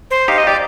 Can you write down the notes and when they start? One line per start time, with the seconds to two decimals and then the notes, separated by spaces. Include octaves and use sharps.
0.11 C5
0.28 D#4 G4 F5
0.38 D#5
0.47 G4 D5